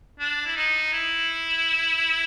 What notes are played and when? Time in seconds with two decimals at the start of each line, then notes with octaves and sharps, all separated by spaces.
0.19 D4
0.46 E4
0.56 D#4
0.93 E4